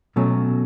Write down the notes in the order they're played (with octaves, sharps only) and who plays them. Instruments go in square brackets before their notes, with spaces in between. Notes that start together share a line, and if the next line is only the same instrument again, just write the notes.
[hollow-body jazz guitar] B2 F#3 A3 C#4